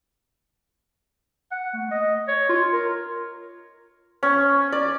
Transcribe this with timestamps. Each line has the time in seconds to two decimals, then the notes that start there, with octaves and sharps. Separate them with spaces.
1.51 F#5
1.73 A3
1.91 D#5
2.28 C#5
2.49 F4
2.73 A#4
4.23 C#4
4.72 D5